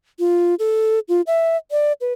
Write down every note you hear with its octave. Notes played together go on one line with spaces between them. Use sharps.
F4
A4
F4
E5
D5
B4